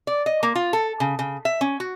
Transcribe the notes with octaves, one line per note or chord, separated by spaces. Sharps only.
D5
D#5
A#3
F4
A4
C#3
C#3
E5
C#4
F#4